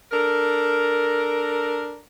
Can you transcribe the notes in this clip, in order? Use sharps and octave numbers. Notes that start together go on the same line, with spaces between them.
D4 A4 A#4